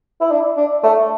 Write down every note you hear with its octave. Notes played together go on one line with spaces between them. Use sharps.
E4
D4
D4
A3